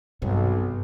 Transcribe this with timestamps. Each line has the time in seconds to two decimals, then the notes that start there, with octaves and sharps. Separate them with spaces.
0.22 B1 G2 C3